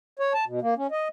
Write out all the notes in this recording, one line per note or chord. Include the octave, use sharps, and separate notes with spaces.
C#5
A5
B2
A#3
C#4
D#5